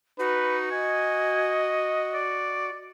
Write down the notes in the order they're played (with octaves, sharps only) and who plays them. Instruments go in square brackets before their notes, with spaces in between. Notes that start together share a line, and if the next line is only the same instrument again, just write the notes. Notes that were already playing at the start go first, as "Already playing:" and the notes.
[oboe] D#4 [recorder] F#4 [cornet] B4
[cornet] D#5 [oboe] G#5
[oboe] D5